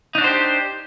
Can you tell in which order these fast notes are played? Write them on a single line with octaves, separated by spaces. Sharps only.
D#4 D4 F#4 C5 G4